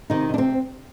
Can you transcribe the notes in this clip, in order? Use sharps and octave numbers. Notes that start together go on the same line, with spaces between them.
C3 D#3 D#4
C3 D4
C4